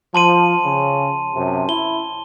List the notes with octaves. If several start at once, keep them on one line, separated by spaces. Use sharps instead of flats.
F3 A5 C6 D#7
C#3
F#2 C3
E4 G7